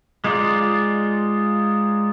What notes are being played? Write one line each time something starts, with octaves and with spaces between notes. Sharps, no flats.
G#3 D#4 F4 D5